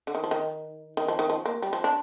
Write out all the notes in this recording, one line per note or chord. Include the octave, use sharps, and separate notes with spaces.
D3
D#3
F3
D#3
D#3
F3
D#3
F3
A#3
G3
F3
D4